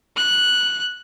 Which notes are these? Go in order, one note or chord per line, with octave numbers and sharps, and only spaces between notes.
F#6